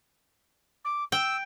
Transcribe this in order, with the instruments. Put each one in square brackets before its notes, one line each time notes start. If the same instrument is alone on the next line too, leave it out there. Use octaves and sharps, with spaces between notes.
[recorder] D6
[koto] G5 [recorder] E6